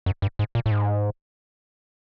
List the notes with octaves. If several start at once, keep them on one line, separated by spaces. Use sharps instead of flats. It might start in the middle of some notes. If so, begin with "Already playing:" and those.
F#2
G2
G#2
A#2
A2
G#2